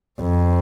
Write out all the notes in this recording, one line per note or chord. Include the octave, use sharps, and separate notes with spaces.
F2